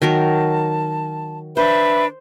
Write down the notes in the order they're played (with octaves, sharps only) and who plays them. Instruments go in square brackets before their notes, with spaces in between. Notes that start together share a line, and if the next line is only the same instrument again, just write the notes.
[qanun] D#3 F#3 A#4 [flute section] A5
[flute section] D4 B4 E5 [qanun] C5